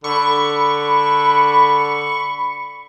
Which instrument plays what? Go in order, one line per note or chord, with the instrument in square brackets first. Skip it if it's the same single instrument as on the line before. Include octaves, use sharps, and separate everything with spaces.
[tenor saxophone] D3 [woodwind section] B5 [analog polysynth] C#6